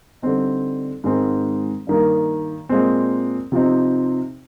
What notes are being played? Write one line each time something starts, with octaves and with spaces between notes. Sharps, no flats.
D3 G3 C4 D#4
G#2 D#3 G#3 C4
G2 D#3 A#3
A#2 G#3 C4
C3 F3 C4 D#4